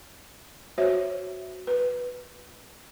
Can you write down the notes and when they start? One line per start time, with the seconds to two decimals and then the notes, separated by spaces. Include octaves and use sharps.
0.78 F#4 C5 C#5 E5
1.67 B4